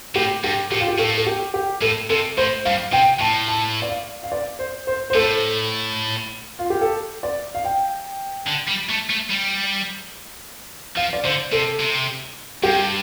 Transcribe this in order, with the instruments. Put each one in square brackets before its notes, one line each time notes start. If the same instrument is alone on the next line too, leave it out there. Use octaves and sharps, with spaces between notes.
[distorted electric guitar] A2 [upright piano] G4
[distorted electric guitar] G2 [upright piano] G4
[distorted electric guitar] A2 [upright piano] G4
[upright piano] F4
G4
[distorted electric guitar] A2 [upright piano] A4
[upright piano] A4
G4
G4
[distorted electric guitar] A2 [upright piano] A4
[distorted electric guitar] C3 [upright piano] A4
[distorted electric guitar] A2 [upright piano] C5
[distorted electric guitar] G2 [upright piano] F5
[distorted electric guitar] C3 [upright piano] G5
[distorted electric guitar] A2 [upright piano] A5
[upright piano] A5
D5
F5
F5
D5
C5
C5
C5
[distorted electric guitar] A2 [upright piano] A4
[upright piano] F4
G4
A4
D5
F5
G5
[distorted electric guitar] D3
G3
A3
A3
G3
[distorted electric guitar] F3 [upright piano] F5
[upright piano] D5
[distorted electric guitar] D3 [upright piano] C5
[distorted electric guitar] C3 [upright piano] A4
[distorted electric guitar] C3
[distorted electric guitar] G2 [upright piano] G4